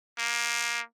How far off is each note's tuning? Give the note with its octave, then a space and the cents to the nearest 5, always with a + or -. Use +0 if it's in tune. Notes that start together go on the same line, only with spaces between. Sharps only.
A#3 +20